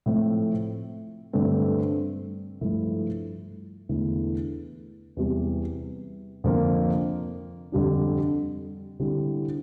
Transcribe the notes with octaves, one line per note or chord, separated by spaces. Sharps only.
A2 F3 A3 C4
G2 D3 A3 C4
G2 F3 A3 E4
E2 D3 A3 E4
E2 C3 G3
F2 D3 F3 A#3
F2 D3 G3 D4
D3 G3 C4 E4 G4